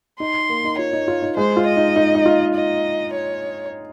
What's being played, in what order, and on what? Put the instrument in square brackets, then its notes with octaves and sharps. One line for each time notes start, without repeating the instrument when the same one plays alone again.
[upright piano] D#4 [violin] C6
[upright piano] A#3
D#4
[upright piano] F4 [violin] C#5
[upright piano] D#4
F4
D#4
[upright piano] G#3 [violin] C5
[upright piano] F4
[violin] D#5
[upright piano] D#4
D#4
D#4
F4
[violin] D#5
C#5